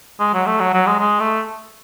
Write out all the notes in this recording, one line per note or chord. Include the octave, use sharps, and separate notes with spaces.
G#3
F#3
A3
F#3
F#3
G#3
G#3
A3